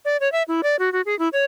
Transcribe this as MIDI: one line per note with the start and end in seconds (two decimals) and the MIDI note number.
0.05 0.17 74
0.21 0.31 73
0.32 0.43 76
0.48 0.61 64
0.63 0.76 74
0.79 0.92 66
0.93 1.01 66
1.06 1.17 68
1.19 1.29 64
1.33 1.45 73